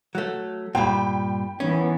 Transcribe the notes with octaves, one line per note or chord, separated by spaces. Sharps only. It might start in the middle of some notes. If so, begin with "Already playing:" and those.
F#3 A3
G2 A#2 G5 B5
D#3 E3 B3 C#4